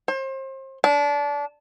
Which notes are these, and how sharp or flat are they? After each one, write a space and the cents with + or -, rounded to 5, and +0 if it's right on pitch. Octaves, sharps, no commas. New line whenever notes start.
C5 +35
D4 -25